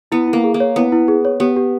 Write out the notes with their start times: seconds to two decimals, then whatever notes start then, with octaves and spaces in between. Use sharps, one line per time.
0.12 B3 E4
0.28 E4
0.33 A#3
0.44 G#4
0.54 A#3
0.60 C#5
0.76 B3 E4
0.92 E4
1.08 G#4
1.25 C#5
1.40 B3 G4
1.56 G4